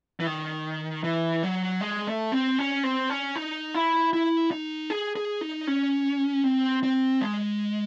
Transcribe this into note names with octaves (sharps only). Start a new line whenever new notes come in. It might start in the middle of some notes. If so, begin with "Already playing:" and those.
E3
D#3
E3
F#3
G#3
A3
C4
C#4
C4
C#4
D#4
E4
E4
D#4
G#4
G#4
D#4
C#4
C4
C4
G#3